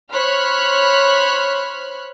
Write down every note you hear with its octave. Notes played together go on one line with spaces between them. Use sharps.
C5 C#5 B5 F6 F#6